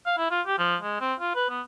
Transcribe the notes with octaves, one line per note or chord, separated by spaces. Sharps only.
F5
E4
F4
G4
F3
G#3
C4
F4
B4
B3